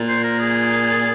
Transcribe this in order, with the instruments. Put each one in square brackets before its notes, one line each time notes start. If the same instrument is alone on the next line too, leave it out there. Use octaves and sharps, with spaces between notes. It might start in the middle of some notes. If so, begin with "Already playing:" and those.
Already playing: [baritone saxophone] A#2
[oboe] C5
A#4
G#4